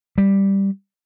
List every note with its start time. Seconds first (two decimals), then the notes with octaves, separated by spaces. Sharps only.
0.18 G3